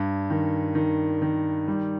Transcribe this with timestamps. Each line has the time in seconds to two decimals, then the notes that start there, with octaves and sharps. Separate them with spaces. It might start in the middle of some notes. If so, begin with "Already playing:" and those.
Already playing: G2
0.30 D#3
0.75 D#3
1.22 D#3
1.68 G3